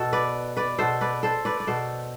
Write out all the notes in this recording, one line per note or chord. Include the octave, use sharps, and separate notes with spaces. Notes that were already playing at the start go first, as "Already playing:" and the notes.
Already playing: B2 A4
B4 D5
B4 D5
B2 A4 C5
B4 D5
A4 C5
B4 D5
D5
B2 A4 C5